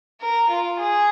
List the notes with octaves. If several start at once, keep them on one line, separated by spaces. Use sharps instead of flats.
A#4
F4
G#4